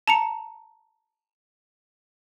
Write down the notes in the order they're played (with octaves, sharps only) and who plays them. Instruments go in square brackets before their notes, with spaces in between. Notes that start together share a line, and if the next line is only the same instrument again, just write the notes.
[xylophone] A5 A#5 C#7